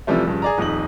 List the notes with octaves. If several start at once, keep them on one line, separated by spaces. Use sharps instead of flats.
C3 E3 F3 G3 A3
G2 C#3 F3
G#4 D5 A#5
D#1 F2 D#4 F#7